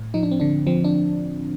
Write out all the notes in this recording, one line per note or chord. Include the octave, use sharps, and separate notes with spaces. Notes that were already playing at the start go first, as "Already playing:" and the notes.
Already playing: A2
F3 D#4
D4
C4
D3 D4
F3 C4
D4